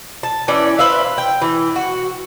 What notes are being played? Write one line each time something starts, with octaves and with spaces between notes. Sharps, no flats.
A5
E3 C#4 D5
B4 C5 E5 F5
G5
E3
F#4